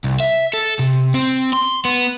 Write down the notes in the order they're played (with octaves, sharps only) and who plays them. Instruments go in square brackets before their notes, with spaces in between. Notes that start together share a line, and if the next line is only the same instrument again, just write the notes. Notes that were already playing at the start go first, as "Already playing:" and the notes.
[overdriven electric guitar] C2
E5
A4
C3
C4
C6
B3